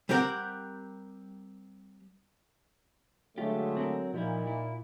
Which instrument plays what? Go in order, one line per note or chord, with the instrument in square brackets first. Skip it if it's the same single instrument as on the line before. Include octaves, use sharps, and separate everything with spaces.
[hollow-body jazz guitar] G3 C4 G4 A#4 F#5
[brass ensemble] D3 G#3 A3 [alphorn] F#3 [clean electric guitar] F4 G4
[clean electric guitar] C4 A4 A#4
[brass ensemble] A#2 [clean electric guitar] F3 G3 E4 [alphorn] D#4
[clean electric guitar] E4